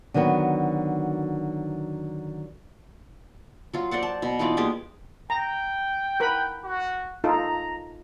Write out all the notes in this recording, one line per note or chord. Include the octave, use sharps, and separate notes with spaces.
D3 D#3 F#3 B3 F#4
F#3 F4
A#4 C5 D5 F#5
A5
B2
E3 D#4 F4 D5
G#3 A#3 G4 G#4
G5 A#5
A#4 B4 B5
F#4
D#4 F4 A4 A#5